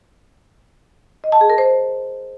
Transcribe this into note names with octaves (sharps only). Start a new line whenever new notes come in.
D#5
A5
G#4
A#4
C5